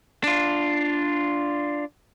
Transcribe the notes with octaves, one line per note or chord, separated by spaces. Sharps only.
D4 F4